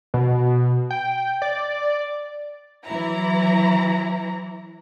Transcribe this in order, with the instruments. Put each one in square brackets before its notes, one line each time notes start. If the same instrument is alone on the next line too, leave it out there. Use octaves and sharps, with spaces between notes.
[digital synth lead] B2
G5
D5
[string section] E3 F#3 E4 A#5